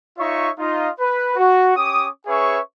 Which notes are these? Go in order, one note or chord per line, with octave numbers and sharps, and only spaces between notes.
D#4 F4 C#5 E5 C#6
D#4 F4 D#5
B4
F#4
C#4 G4 D6 D#6
C#4 G#4 B4 C#5 E5 C#6